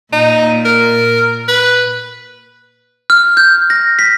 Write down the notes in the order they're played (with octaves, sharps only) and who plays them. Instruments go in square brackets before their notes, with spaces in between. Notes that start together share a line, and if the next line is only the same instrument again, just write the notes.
[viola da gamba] A#2 [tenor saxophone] D#4
[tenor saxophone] A#4
B4
[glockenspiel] F6
G6
A#6
B6